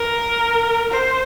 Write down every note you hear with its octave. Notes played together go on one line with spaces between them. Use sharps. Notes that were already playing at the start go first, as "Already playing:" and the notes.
Already playing: A#4
C5